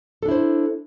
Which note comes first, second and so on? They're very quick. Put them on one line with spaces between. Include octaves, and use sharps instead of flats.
A4 D4 E4 C5